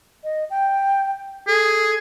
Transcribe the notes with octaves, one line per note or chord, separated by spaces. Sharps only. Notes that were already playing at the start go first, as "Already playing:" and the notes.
D#5
G5
G#4 A4